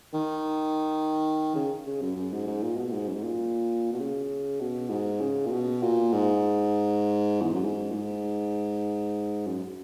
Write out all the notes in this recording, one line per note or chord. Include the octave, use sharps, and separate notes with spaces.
D#3
C#3
C#3
F#2
F#2
G#2
G#2
A#2
B2
G#2
F#2
G#2
A#2
B2
C#3
B2
G#2
C#3
A#2
B2
A#2
G#2
E2
F#2
G#2
A#2
G#2
F#2